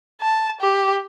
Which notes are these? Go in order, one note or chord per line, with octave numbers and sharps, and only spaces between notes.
A5
G4